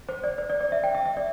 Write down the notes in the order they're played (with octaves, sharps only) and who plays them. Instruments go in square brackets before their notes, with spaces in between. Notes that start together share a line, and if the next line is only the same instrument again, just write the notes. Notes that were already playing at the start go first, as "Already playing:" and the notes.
[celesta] C5
D5
C5
D5
D5
E5
G5
E5
E5
D5